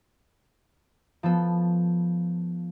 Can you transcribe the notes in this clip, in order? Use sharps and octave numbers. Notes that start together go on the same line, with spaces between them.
F3 B3 A4